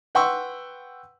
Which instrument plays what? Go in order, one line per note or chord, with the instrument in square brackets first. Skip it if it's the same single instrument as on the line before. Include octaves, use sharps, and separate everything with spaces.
[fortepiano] B4 F#5 G5 C6 C#6 E6